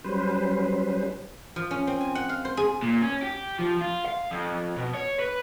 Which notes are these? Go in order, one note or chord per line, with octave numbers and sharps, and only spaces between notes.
F#3 G3 C#4 B4 C5
F3
C#4
C4
G#5
F#5
F5
C5
G#4
A#2
C#4
G4
F3
F4
F5
F2
B2
C#5
B4